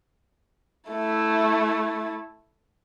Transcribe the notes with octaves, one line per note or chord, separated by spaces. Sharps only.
A3 E4